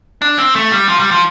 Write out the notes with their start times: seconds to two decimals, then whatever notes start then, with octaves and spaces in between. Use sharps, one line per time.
0.22 D4
0.39 C4
0.55 A3
0.72 G3
0.89 F3
1.00 G3
1.11 F3